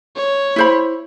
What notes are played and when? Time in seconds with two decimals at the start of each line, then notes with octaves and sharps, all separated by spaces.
0.16 C#5
0.56 E4 C5 B5